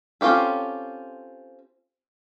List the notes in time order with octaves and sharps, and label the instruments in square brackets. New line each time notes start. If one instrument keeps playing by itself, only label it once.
[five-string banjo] C4 C#4 F4 G4 A4